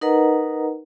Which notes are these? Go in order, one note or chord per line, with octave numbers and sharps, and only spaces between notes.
D#4 A#4 B4 D#5 F#5 A#5